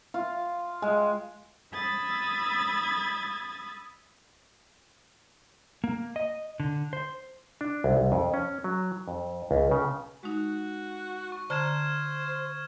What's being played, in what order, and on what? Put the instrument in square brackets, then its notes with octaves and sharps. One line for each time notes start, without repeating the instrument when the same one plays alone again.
[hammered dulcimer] F4
G#3
[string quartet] B5 D#6 E6 G#6 A6
[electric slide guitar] A#3
D#5
D3
C5
[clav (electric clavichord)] D4
C2
C2
F2
C#4
F#3
F2
C#2
C#3
[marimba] G#3 D#4 [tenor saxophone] F#4
[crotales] C#6
[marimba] D3 A5 A#5 [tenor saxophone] C5 [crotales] F6 G#6 E7